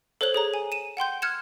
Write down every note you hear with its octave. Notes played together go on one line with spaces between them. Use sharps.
A4 C5 C#5 F#6 F#7
G#4 C#5 A#5
G#5
D#7 E7
F#5 G5 C6 G6
F6 F#6 G#6 C#7 E7